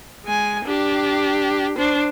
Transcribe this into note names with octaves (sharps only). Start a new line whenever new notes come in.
G#3 G#5
D4 G4
D4 C5